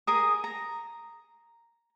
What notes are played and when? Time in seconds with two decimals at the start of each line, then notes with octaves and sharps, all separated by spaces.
0.07 G#4 A#4 D#6
0.44 A#5